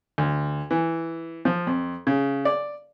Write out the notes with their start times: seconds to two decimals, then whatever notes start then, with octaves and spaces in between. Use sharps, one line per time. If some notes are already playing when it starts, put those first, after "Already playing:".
0.18 D2
0.71 E3
1.45 F3
1.67 F2
2.07 C#3
2.45 D5